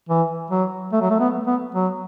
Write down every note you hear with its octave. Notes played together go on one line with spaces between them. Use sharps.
E3
F#3
A3
F#3
A3
B3
B3
F#3